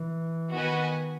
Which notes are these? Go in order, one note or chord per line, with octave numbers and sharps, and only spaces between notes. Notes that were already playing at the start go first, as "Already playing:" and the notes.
Already playing: E3
D#3 B3 F#4 B4 D#5 G#5